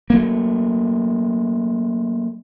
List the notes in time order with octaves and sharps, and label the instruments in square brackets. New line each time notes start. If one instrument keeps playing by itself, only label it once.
[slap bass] F#3 A3 A#3